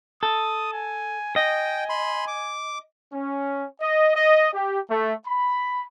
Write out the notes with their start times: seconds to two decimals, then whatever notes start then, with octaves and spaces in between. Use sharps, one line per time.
0.23 A4 D#6
0.73 G#5
1.36 D#5 G5 G#5
1.89 B5 C6
2.27 D6
3.13 C#4
3.80 D#5
4.15 D#5
4.53 G4
4.90 A3
5.26 B5